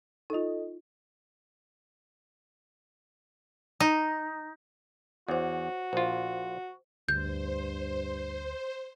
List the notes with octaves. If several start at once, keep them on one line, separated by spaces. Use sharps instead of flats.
D#4 F4 A4 D#5
D#4
E2 F#4 C5 C#5
A#1 F4 C5
D2 G2 C5 G6